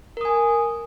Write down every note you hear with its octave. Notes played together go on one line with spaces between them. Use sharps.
A#4 G#5 D#6